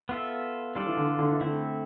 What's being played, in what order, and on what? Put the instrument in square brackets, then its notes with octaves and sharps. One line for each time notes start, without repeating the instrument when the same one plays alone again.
[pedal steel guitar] B3 F4 A4 E5
[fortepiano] G3 [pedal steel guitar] D4 F4 A4 D5
[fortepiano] E3
D3
D3
E3
[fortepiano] D3 [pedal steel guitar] A3 C4 E4